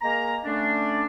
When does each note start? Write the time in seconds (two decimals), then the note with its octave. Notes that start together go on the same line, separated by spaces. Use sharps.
0.01 G#3 A#3 A#4 A#5
0.44 D3 A3 C#4 D4